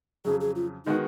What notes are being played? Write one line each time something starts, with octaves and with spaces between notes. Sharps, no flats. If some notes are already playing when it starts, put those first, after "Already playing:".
F2 C#3 F#3 G#4
G#4
F4
D#3 G#3 B3 D#4 F#4